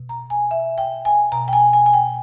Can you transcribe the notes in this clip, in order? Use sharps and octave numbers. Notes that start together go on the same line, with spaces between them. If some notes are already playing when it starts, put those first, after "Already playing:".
Already playing: B2
A#5
G#5
E5
G5
G#5
B2 A#5
G5
G#5
G#5
G#5
G5